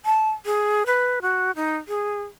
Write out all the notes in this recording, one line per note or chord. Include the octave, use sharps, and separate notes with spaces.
A5
G#4
B4
F#4
D#4
G#4